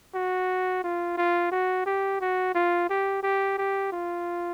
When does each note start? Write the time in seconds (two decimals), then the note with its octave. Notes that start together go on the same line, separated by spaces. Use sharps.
0.15 F#4
0.84 F4
1.17 F4
1.52 F#4
1.86 G4
2.21 F#4
2.55 F4
2.89 G4
3.23 G4
3.58 G4
3.92 F4